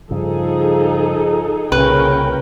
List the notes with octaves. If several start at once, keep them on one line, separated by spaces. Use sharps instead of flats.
G2 C#3 F3 D#4 G#4 A4
C2 A#2 C#3 C#4 A#4 B4 G5